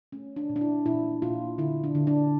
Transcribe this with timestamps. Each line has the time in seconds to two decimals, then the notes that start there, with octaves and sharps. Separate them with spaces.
0.12 A3 C#4
0.36 D4
0.49 A#2
0.56 D4
0.61 E4
0.86 A#2 E4
1.22 A#2 F4
1.58 D3 E4
1.84 D4
1.95 D3
2.07 D4